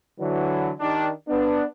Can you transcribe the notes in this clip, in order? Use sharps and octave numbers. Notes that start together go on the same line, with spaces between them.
D3 E3 F#3
D#3 D4 G4
B3 D4